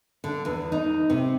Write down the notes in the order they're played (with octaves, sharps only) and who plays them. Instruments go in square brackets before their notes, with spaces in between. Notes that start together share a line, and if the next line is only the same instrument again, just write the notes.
[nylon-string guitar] D3
E2
D#4
C3